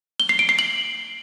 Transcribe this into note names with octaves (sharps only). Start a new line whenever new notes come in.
G7
C7
D7
C7
F#7